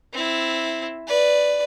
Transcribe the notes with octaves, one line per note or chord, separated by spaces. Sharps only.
C4 E4
B4 D5